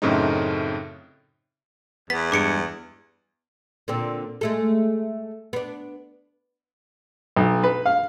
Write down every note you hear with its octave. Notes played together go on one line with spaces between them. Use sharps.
F#2 A2 C#3 A3 C4 D#4
E2 B3 B6
G2 G#3 D6 C#7 D7
A#2 D3 C4
G#3 A3 A4
B3 D4
B1
B4
F5